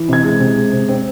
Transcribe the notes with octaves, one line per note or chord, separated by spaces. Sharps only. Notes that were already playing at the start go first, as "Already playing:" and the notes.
Already playing: E3
C3 G#6
G#3
C3
G#3
C3
C4